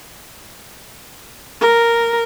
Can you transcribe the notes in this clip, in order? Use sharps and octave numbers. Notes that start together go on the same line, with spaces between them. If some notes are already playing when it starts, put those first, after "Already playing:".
A#4